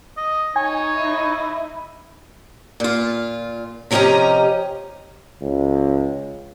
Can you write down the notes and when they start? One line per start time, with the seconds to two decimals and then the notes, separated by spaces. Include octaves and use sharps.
0.17 D#5
0.56 D#4 C#5 D#5 G#5
0.97 E4
2.80 A#2 F4
3.91 C3 F3 C#4 G4 D#5 A#5
5.41 C#2